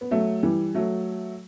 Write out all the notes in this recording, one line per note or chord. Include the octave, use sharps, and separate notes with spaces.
B3
F#3 A3
E3 G3
F#3 A3